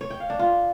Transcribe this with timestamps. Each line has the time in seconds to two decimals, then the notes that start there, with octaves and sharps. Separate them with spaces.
0.01 C#5
0.10 G5
0.20 F5
0.30 D4
0.39 F4